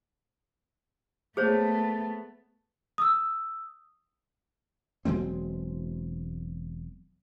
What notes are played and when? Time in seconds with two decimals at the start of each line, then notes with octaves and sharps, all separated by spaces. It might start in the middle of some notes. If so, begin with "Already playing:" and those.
1.37 A3 B3 G#4 C5 C#5
2.98 D#6 E6
5.05 E1 F#3 G#3 C4